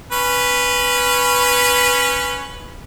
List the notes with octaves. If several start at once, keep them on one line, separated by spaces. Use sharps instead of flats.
C#4 B4